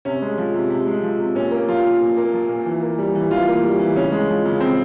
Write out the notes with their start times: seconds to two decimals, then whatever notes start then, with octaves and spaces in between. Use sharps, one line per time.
0.05 C3 C#4
0.22 G#3
0.38 F3
0.54 C3
0.70 C3
0.87 G#3
1.03 F3
1.19 C3
1.35 A#2 C#4
1.51 A#3
1.68 F3 F4
1.85 A#2
2.01 A#2
2.17 A#3
2.33 F3
2.49 A#2
2.66 E3
2.82 A#3
2.98 G3
3.15 E3
3.31 E3 F4
3.48 A#3
3.64 G3
3.79 E3
3.95 C#3 C#4
4.12 G#3
4.28 F3
4.45 C#3
4.61 C#3 C4